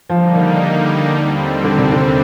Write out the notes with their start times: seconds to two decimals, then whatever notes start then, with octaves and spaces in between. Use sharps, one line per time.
0.09 D3 F3 G3 A#3 D#4
0.35 D#3
1.12 D#2 D3 G3 C4
1.64 D3
1.78 C3
1.92 D3